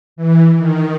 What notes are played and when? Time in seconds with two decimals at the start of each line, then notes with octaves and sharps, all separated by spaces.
0.16 E3
0.57 D#3